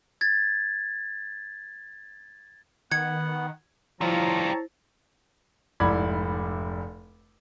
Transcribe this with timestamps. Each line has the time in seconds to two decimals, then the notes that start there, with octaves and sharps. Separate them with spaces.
0.21 G#6 A6
2.91 D#3 B3 F#5 G#6 C#7
4.01 F3 G3 E4 F4 C5 C#5 A5 A#5
5.80 F1 G#2 E4 D5 B5 G#6